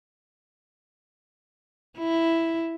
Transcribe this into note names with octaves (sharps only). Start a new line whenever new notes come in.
E4